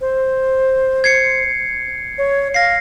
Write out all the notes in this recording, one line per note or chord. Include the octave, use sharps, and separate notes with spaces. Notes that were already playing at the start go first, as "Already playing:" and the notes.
C5
G#6 C7 C#7
C#5
F5 A#6 C7